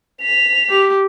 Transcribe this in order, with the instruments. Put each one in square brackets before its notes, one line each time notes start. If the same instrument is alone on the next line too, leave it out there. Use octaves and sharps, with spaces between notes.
[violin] B6 F7
[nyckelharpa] G4